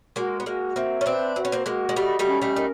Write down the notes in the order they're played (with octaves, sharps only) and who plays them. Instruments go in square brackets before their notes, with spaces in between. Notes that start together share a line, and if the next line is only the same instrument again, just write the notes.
[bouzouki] G#3 A#3 [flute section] F#4
[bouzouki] B3
[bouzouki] G#3 A#3 [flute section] F#4
[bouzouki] A#3 C4 [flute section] E5
[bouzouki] C#4
[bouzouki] C4 D4 [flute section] B4
[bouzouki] C4 [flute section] F#4
[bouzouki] C#4
A#3 C4
[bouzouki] G#3 A#3 [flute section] F#4
[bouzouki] G#3
[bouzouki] G3 A3 [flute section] D#5
[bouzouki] G3 A3
[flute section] C#4
[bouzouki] G3 A3
[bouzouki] D#4 [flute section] A#4